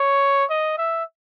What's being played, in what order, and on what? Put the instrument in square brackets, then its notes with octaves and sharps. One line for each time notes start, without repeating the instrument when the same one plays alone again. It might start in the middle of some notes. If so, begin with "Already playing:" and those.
Already playing: [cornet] C#5
D#5
E5